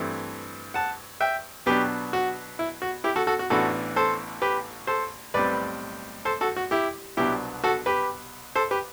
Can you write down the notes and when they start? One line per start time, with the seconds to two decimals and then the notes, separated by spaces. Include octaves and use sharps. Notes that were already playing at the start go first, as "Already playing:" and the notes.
Already playing: G2 E3 A3 C4
0.74 F#5 A5
1.20 E5 G5
1.66 B2 F#3 B3 D4 G4 B4
2.13 F#4
2.59 E4
2.82 F#4
3.04 E4 G4
3.16 F#4 A4
3.27 F#4 A4
3.39 F#4
3.50 A1 A2 E3 B3 D4 F#4 A4
3.96 A4 C5
4.42 G4 B4
4.87 A4 C5
5.34 B1 A2 G3 C4 B4 D5
6.25 A4 C5
6.41 F#4 A4
6.56 F#4
6.71 E4 G4
7.17 C2 B2 F#3 B3 D4 E4 G4
7.64 F#4 A4
7.86 G4 B4
8.56 A4 C5
8.71 G4 B4